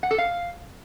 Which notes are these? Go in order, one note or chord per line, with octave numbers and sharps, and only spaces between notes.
F#5
A4
F5